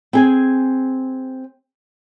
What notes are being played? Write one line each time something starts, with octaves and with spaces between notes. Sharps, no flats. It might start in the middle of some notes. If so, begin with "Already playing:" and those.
C4 G#4 G#5